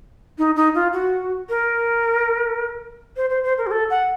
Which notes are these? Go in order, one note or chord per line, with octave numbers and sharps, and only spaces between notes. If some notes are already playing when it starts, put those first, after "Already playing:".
D#4
D#4
F4
F#4
A#4
C5
C5
C5
A#4
F#4
A4
F#5